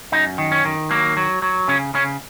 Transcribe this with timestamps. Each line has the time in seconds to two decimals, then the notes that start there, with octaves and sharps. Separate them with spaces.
0.12 F#2 D#4
0.38 D#3
0.52 C#4
0.65 D#3
0.90 F#3 A#3
1.17 F#3
1.42 F#3
1.68 C#3 C#4
1.94 C#3 C#4